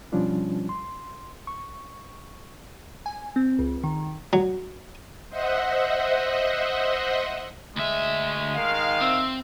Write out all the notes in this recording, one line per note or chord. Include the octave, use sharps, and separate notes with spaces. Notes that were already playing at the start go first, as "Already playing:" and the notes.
B2 F3 G3 C#4 D4 F4
C6
C#6
G#5
C4
C#2
D#3
F#3
C5 D#5 E5 F#5
D2 G#3 E5
D#3 F5
C4 E5